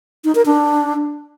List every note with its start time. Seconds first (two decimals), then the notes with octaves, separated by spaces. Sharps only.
0.24 D#4
0.35 A#4
0.46 D4